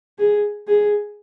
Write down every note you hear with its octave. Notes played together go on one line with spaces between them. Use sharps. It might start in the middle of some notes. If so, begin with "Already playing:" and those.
G#4
G#4